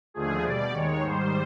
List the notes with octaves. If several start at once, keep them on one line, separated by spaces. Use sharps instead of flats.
D#2 D3 F3 A3 G#4
B2 G3 D5
D#2 D#3 G#3 C#5
G#2 D#3 G3 C5